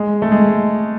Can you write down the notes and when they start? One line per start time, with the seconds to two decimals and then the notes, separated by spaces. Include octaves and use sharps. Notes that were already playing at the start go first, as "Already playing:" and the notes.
Already playing: G#3
0.22 A3
0.31 G#3